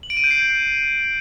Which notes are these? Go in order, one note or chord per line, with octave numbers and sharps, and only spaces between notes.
F#7
D7
D#7
G6
C7